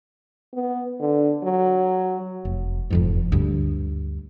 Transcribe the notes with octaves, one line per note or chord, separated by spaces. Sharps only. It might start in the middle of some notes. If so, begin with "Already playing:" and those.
B3
D3
F#3
F1
F1 F2 G#2
D2 G2